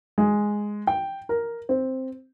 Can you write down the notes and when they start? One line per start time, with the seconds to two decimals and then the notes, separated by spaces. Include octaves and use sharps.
0.18 G#3
0.87 G5
1.29 A#4
1.69 C4